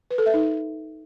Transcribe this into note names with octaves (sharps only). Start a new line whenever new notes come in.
B4
A4
E5
D#4